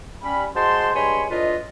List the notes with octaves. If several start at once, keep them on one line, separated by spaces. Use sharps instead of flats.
G3 C#4 B5
G#3 F#4 C5 A5 C6
G2 G#3 C#5 G#5 B5 C6
A2 D4 F4 B4 D#5